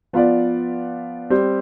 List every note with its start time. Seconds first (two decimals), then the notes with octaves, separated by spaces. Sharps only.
0.13 F3 B3 F4 B4 D5
1.30 G3 C4 G4